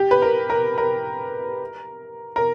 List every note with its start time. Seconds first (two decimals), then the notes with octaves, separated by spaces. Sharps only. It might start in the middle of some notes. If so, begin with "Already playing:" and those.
Already playing: G4
0.11 B4
0.22 A#4
0.50 A#4
0.78 A#4
2.36 A#4